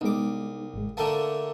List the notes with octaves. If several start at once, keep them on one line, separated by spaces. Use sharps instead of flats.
C2 G#3 B3 D#4 D6
G#1 G#2 G#3
D3 A3 A#3 A5